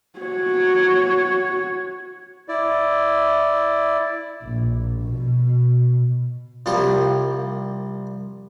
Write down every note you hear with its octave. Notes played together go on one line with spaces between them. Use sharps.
F#4 C#5
E4 D5
A#1
B2
C2 F3 G3 A#3 C#6